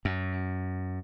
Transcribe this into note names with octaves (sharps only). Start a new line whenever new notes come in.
F#2